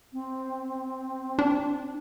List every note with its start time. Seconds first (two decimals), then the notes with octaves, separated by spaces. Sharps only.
0.13 C4
1.39 D4